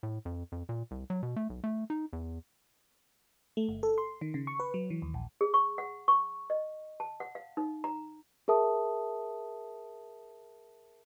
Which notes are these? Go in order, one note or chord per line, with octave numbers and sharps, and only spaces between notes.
A2
F2
F2
A#2
C2
F#3
B2
A3
B1
A3
D#4
E2
A3
G1
A4
C6
D#3
C#3
C#6
B4
F#3
E3
D#2
A#1
G#4
C#6
F#5
C#6
D#5
A5
F#5
F5
D#4
A#5
G#4 A#4 E5 A5 D#6